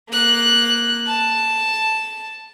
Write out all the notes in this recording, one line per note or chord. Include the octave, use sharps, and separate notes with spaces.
A#3 F#6
A5